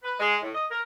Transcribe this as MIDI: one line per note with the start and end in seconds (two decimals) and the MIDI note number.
0.03 0.14 71
0.20 0.37 56
0.43 0.50 45
0.55 0.66 75
0.71 0.80 70